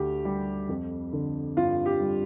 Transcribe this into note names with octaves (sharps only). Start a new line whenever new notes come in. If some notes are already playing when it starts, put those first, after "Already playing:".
Already playing: D2 G4
G3
F2
D3
G2 F4
G4
G3